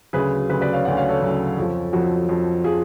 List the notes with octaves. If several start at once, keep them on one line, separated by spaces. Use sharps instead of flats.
D2 C#3 F#3 G#4 B4
D2 C#3 F#3 G#4 B4
B4 D5
C#5 F5
D2 C#3 F#3 D5 F#5
C#5 F5
A4 C#5
D2 C#3 F#3
F2 F3
F2 F3 F#4
F2 F3
F3 G#4